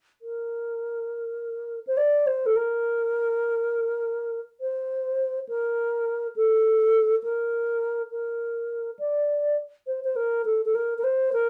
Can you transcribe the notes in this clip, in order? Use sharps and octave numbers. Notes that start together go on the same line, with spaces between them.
A#4
C5
D5
C5
A4
A#4
C5
A#4
A4
A#4
A#4
D5
C5
C5
A#4
A4
A4
A#4
A#4
C5
A#4